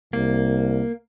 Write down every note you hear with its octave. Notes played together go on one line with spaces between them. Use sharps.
C2 A#3